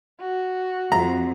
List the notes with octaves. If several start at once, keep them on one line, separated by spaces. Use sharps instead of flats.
F#4
F2 A#5